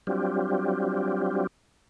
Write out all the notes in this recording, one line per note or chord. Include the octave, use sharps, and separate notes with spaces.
F#3 G3 C4 D4 F4 G4